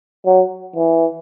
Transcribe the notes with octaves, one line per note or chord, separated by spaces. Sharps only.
F#3
E3